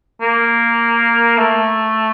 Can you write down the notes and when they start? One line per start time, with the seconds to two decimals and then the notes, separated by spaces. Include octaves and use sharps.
0.21 A#3
1.37 A3